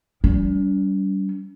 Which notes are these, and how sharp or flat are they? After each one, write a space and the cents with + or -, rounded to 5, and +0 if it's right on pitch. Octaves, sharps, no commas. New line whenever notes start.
G3 -25 C#4 +45